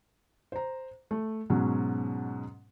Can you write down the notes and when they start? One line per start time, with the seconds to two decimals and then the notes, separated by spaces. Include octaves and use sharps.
0.52 C5 A#5
1.11 A3
1.50 G#2 B2 F#3 C#4